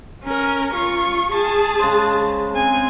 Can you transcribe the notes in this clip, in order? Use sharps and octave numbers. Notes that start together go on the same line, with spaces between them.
C#4 A#4
F4 C#6
G#4 A5
C#3 G#3 C5
C4 G#5